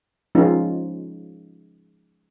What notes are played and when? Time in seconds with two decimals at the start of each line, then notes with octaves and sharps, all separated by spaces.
0.35 F3 G#3 C#4 D#4 F4